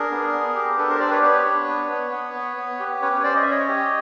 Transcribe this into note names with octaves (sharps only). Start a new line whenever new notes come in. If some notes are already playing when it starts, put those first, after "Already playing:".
Already playing: D4 G#4 A#4
B3
B3
G4
D4 A4 B4
A#4 C5
G4 C5 D5
B4 C#5
B3 B4 C#5
D4
B3
B3
B3
B3
B3
G4
C#4 B4 C#5
B4 C#5
C#4 C5 D5
D#5
E5
C#4
C#5 D#5
G4